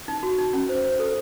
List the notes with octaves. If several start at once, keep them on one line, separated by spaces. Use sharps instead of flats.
D#4
F#4
D#4
C#4
C5
C5
A4